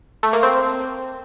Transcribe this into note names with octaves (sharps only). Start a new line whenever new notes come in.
A3
A#3
C4